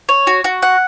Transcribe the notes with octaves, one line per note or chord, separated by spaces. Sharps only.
C#5
F#4
F#4
F#5